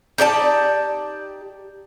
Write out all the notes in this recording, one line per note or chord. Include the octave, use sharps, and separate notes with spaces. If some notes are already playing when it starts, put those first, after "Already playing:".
D#4 G4 D5 A5